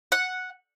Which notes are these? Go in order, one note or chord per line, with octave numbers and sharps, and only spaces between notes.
F#5